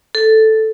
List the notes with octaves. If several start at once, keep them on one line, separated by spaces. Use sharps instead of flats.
A4